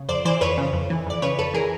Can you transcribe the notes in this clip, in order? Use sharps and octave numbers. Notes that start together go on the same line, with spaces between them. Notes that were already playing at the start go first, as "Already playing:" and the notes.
Already playing: C#3
F2 C5 D5
E3 C5 D5
F2 B4 C#5
C#3
F2
E3
F2 D5
C#3 B4 C#5
F2 A4 B4
E3 G#4 A#4